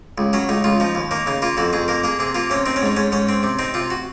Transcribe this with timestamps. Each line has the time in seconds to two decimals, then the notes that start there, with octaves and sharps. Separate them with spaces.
0.18 C#2
0.33 F#3 C#4
0.49 C#2 D#4
0.64 C#2 F4
0.80 F3 D#4
0.95 D#2
1.11 A#3 D#4
1.26 C#3 D#4
1.42 A#3 F4
1.57 F2 F#4
1.73 F2 G#4
1.88 A#3 A#4
2.04 A#3 G#4
2.19 C3 G#4
2.35 A#3 F4
2.50 C3 C#4
2.66 C4 D#4
2.76 C#4
2.82 G#2 D#4
2.97 G#2 C#4
3.12 G#2 C#4
3.29 C4
3.43 C3
3.59 C4 D#4
3.74 C3 F4
3.90 F#4